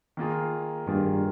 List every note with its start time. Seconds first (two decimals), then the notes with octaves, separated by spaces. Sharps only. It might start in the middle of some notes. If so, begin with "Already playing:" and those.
0.17 D#3 A#3 F4 G#4
0.87 G2 D#3 A#3 F4 G#4